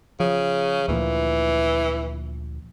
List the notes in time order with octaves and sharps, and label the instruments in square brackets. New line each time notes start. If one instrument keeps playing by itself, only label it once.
[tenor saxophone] C#3 [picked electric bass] F3
[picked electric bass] D2 A#2 F3 [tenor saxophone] E3